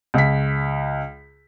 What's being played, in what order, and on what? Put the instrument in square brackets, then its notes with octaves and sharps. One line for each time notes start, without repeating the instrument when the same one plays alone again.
[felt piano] C#2 B6